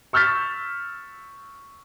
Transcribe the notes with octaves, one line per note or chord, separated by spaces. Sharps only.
C#6 E6 F6 G6 A6 B6